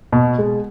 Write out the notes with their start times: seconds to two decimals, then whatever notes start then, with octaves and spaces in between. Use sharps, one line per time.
0.13 B2
0.39 G#3